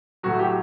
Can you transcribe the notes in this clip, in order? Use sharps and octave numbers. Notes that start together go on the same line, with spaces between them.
A2 F#3 F#4
G4